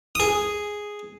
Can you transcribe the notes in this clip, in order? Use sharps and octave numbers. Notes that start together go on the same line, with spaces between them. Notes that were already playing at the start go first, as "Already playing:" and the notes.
G#4 D#6